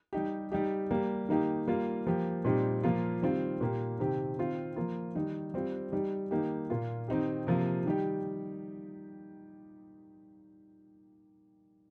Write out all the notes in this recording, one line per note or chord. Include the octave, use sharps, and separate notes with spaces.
G3 D#4 G4
G3 D#4 G4
G3 A#3 G4
D#3 A#3 D#4 G4
G3 A#3 F4
F3 A#3 G4
A#2 G3 C4 D#4 G4
A#2 F3 A#3 F4
D#3 G3 C4 F4
A#2 A#3 G4
C3 D#3 C4 G4
D#3 C4 F4
F3 A#3 F4
D#3 G3 D#4
G3 C4 F4
G3 D#4 G4
D#3 A#3 D#4 G4
A#2 A#3 F4
D#3 C4 D#4 G4
C3 F3 A#3 F4
D#3 G3 D#4 G4